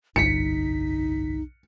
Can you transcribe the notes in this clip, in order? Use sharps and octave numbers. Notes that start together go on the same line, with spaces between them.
G1 C2 F2 D#4 B6 C#7